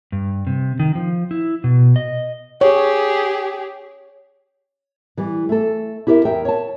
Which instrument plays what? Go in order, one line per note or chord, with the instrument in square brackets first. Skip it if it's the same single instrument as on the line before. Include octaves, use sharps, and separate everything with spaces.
[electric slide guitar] G2
C3
D#3
F3
E4
B2
D#5
[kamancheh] G4 G#4 [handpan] C#5
[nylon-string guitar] E3 G3
A3 A4
E4 G4 A#4 C#5 E5
E2 A#4 E5 G5
C#5 A5